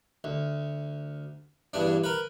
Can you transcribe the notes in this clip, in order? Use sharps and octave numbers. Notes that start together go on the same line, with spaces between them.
D2
E2 G2 D4
A#4 B4